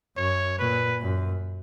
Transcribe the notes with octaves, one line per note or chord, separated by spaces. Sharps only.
F#2 C#5
A#2 B4
F#2